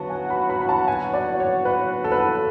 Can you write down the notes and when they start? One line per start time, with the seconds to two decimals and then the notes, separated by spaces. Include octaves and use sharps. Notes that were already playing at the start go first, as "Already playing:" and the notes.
Already playing: D3 F#3 B3 F#4 A5
0.10 G#5
0.30 B5
0.50 B5
0.61 B5
0.69 A5
0.88 G#5
1.14 D5
1.40 C#5
1.65 B4
2.04 A4
2.12 B4
2.19 A4